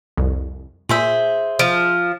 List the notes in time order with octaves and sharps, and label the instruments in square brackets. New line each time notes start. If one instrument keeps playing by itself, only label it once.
[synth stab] C2 F2
[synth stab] A#2 [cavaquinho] G#4 C5 E5
[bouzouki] F3